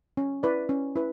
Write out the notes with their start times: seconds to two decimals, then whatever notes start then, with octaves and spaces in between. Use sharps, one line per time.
0.17 C#4
0.43 E4 B4 D5
0.69 C#4
0.96 E4 B4